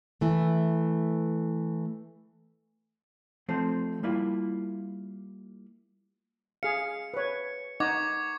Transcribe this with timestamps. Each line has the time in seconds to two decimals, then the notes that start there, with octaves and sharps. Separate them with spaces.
0.21 E3 A3
3.48 F3 A3 C4 C5
4.03 G3 A#3 E4 F4
6.63 G#4 F5 C#7
7.14 B4 C#5
7.80 D#4 D#5 F#5 C#6 D6 G#6